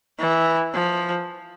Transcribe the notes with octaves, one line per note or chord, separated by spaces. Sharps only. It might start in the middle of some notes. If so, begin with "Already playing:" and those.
E3
F3